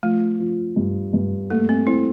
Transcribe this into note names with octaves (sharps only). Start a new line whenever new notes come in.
F3 A3
F3
G2
G2
A3 A#3
C4
C4 E4